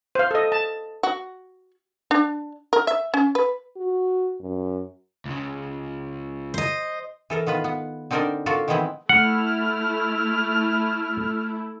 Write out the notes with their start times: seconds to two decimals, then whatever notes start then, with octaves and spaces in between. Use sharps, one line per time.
0.15 C5 F5
0.31 A4 D#5
0.52 A5
1.03 F#4
2.11 D4
2.73 A#4
2.87 E5
3.14 C#4
3.35 B4
3.77 F#4
4.40 F#2
5.25 C#2 C#3
6.54 C5 D#5
7.30 E3 A4 A#4
7.46 D#3 B3 F4 B4
7.64 B3
8.11 D3 C4 D#4 A#4 C5 D5
8.46 F4 F#4 A4 A#4 D5
8.68 D#3 E3 G#3 B3 C4 E4
9.09 A3 E4 F#5 F6